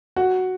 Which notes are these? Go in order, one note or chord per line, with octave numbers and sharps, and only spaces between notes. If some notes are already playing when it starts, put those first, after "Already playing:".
F#4